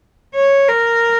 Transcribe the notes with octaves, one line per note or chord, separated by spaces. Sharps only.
C#5
A#4